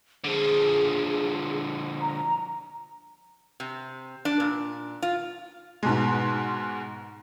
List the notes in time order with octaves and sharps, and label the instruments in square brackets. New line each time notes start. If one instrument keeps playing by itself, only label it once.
[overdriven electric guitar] D3 F3 [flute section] G#4
[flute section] A#5
[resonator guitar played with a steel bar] C3
D4
A#2
F4
[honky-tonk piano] G#2 B2 G#3